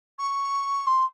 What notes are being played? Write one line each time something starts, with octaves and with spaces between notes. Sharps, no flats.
C#6
C6